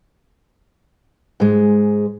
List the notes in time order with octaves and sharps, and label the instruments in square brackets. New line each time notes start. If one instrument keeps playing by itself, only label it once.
[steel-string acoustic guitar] G#2 G#3